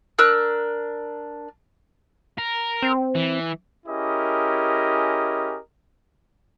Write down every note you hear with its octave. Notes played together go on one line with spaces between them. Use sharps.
D4 A#4 E6 F#6
A#4
C4
E3
C#4 E4 G4 G#4 A#4 D#5